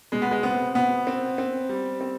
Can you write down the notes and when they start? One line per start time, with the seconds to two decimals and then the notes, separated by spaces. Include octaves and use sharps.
0.12 B2 G#3
0.22 B3
0.31 G#3
0.43 B3 C4
0.75 B2 B3
1.07 C4
1.38 C4
1.69 G3
2.01 C4